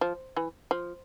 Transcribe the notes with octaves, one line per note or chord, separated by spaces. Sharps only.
F3
E3
F3